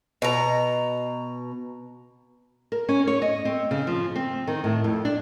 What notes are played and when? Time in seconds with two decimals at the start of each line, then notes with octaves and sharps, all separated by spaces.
0.22 B2 A#5
2.72 A#4
2.89 C#4
3.07 C#5
3.22 D#5
3.45 C4
3.71 C#3
3.87 F3
4.16 C4
4.47 D#3
4.64 A2
4.84 F2
5.05 D4